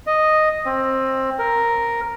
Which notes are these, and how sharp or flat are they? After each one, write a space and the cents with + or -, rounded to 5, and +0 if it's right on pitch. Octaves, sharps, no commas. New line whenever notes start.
D#5 -5
C4 +20
A#4 +0